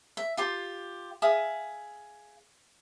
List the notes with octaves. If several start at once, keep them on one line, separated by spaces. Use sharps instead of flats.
E5
F4 G4 C6
G#4 E5 F5 D#6